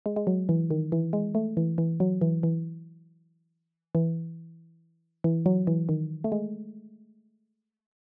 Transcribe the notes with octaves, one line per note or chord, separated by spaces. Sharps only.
G#3
G#3
F#3
E3
D#3
E3
G#3
A3
E3
E3
F#3
E3
E3
E3
E3
F#3
E3
D#3
A3
G#3